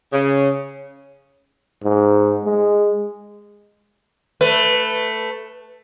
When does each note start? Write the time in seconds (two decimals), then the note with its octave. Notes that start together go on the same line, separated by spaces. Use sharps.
0.13 C#3
1.84 G#2
2.45 G#3
4.41 A3 B4